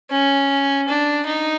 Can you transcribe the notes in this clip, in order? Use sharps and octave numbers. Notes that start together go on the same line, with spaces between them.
C#4
D4
D#4